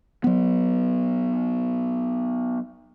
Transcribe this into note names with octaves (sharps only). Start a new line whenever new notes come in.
F#3 B3